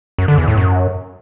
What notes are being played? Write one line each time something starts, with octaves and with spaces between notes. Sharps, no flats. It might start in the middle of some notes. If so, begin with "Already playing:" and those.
F#2
D3
E2
A2
F#2